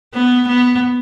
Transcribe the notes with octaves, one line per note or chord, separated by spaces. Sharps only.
B3
B3